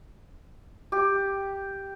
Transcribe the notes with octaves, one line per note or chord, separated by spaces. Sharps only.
G4